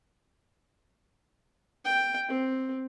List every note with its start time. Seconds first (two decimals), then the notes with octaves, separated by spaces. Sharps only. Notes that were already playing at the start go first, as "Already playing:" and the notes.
1.85 G5
2.29 C4